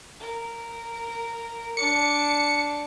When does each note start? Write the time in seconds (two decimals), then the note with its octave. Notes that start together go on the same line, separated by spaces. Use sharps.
0.20 A#4
1.77 D4 D6 C#7